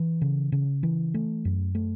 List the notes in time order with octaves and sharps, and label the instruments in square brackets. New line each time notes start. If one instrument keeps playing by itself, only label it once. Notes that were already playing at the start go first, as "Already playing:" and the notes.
Already playing: [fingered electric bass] E3
C#3
C#3
E3
A3
F#2
A3